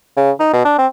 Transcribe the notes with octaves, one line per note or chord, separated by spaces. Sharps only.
C#3
D#4
B2
D4
C4